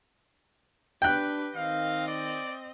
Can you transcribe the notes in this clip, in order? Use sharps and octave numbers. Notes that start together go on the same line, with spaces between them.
D4 G4 B4 G5 F#6
D#3 C4 D#5 F5
D5